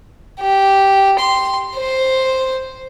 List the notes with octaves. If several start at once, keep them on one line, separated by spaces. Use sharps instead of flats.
G4
C6
C5